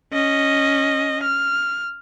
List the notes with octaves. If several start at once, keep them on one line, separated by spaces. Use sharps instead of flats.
C#4 D#5
F6